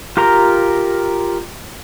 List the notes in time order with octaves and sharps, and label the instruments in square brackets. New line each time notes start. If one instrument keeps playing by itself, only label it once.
[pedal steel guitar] F4 G4 A#4 A#5